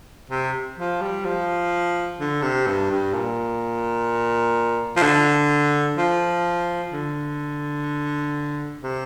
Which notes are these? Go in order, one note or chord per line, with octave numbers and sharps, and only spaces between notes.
C3
F3
G3
F3
D3
C3
G2
G2
A#2
F3
D3
F3
D3
C3